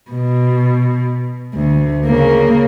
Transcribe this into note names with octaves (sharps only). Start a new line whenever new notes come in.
B2
D2
C#3 A#3